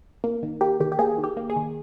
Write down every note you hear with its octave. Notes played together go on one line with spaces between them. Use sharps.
A#3
D#3
A#3 G4
D#3 G4
G4
A#3 G#4
D#3
G4
A#3
G#4
D#3